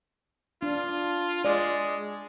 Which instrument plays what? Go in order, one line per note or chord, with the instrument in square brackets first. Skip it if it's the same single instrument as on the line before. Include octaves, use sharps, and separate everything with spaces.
[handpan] D4 [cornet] F4
[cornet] G#3 [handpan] D5